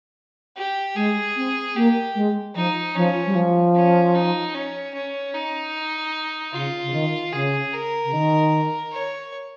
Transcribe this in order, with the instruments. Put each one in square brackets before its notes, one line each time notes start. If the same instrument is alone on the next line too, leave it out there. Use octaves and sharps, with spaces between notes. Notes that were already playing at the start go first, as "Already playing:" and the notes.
[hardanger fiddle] G4
[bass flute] G#3 [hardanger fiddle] G#4
[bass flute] C4
[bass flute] A#3 [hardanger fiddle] G4
[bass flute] G#3
[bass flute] F3 [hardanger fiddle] D#4
[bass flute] F3 [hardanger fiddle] C#4
[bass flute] G3
F3
[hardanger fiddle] C#4
D#4
C#4
C#4
D#4
[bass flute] C#3 [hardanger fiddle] F4
[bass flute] C#3
D#3
[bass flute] C#3 [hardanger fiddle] G#4
[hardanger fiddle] A#4
[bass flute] C#3
D#3
[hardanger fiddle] C#5